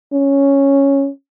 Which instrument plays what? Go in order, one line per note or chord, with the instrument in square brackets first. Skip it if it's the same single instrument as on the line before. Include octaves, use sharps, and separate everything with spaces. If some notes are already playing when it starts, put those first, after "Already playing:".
[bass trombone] C#4